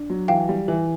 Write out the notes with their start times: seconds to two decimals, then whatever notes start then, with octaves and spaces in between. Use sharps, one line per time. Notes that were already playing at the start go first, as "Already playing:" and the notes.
Already playing: D4
0.10 F#3
0.28 E3 F5 G5
0.49 G3
0.68 E3